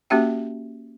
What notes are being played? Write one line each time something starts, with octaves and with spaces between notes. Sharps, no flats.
A#3 C#4 F#4 G4 E5 G5